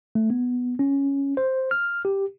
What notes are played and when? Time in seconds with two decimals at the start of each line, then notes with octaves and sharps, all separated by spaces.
0.15 A3
0.30 B3
0.79 C#4
1.37 C5
1.71 F6
2.05 G4